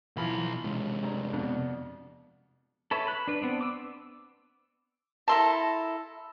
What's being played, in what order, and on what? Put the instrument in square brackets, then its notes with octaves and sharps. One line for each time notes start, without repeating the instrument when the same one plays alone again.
[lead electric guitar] B1 B5 [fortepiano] E3 F3
[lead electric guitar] C3 G#3
[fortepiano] G2 A#5
F2 B2 D4
[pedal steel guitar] A4 B4 C#5 E5
B5 F#6
D4 B4
B3 C4 D4
D6 E6
[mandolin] E4 A4 A#4 [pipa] A5 C6